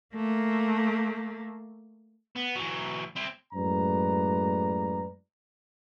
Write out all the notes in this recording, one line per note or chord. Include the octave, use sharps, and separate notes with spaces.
A3 A#3
B3
E3 F#3
C4 E4
F#2 A2 G#3 B4 D5 A#5